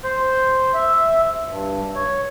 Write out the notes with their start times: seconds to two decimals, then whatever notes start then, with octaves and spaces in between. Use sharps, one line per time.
0.04 C5
0.74 E5
1.50 G2
1.95 C#5